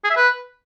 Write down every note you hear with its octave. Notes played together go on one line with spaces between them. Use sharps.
G#4
E5
B4